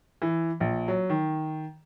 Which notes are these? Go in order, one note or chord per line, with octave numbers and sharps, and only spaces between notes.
E3
A#1
F#3
D#3